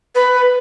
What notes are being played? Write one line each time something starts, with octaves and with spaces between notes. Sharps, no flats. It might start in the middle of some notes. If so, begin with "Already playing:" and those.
B4